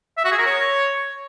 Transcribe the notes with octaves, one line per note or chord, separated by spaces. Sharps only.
E5
F#4
G#4
A#4
C#5